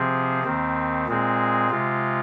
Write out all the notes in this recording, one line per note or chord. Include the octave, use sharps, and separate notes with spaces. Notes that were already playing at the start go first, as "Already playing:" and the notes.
Already playing: C3 F3 C4 G#4
D#2 D#3 C4
A#2 G#3 C4 G#4
C3 G#3 F4